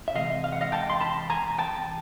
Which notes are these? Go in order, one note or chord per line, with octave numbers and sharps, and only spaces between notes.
E5
C3 E3 G#3 D#5 F5
F5
F#5
D#5 F5
G5 A5
C6
A5 B5
G#5 A#5
G5 A5